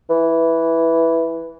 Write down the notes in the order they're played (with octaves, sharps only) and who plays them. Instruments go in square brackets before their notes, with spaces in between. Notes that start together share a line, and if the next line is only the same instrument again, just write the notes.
[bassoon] E3